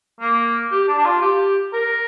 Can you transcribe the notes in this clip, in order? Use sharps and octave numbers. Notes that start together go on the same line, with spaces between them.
A#3
G4
D4
D4
F4
G4
A#4